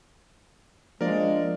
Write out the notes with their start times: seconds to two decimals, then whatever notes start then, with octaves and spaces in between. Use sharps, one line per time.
1.01 F3 G#3 A#3 D4 A#4 D5 F5